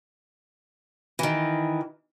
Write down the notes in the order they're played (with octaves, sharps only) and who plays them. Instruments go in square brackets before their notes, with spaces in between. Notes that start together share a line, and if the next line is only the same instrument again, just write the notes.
[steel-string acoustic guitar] D#3 E3